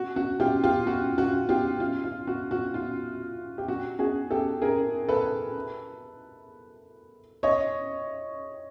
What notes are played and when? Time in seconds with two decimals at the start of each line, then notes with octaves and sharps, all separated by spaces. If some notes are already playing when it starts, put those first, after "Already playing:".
Already playing: F#4
0.16 F#4
0.40 F4 G4
0.63 F4 G4
0.87 F#4
1.18 F#4
1.49 F4 G4
1.80 F4
2.04 F4
2.27 F#4
2.51 F#4
2.74 F4
3.58 G4
3.68 F#4
3.99 F#4 G#4
4.31 G4 A4
4.62 G#4 A#4
5.08 A4 B4
7.43 C#5 D#5